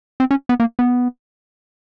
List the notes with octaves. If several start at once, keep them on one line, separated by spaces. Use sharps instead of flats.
C4
C#4
B3
A#3
B3